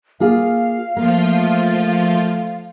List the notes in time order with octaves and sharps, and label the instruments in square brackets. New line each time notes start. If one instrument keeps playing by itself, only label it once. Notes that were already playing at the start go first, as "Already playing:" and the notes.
[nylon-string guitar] A#3 F4 G#4 [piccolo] F5
[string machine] F3 F4 [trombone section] A3 [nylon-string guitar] A#3